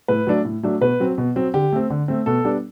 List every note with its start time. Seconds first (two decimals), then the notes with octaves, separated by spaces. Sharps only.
0.08 A2 B4
0.27 F#3 A3 D4
0.45 A2
0.63 F#3 A3 D4
0.81 B2 B4
1.00 F#3 C4
1.18 B2
1.36 F#3 C4
1.54 D3 G4
1.73 A3 C4
1.90 D3
2.08 A3 C4
2.26 B2 A4
2.44 G3 B3 D4